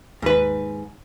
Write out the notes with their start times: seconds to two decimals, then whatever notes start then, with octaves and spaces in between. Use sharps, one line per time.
0.22 D#2 G#2 B4